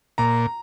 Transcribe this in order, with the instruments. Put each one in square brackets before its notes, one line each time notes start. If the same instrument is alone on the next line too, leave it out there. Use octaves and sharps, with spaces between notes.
[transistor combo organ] A#2 [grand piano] A#5